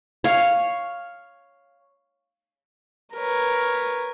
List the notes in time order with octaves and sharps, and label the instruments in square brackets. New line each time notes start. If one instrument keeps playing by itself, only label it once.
[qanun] C#5 F5
[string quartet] A#4 B4 C#5